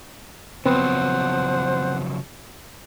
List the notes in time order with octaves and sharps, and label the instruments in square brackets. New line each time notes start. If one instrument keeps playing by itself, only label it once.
[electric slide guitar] C#3 F3 F#3 [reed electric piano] B3 C4 [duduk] C5 [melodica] F#5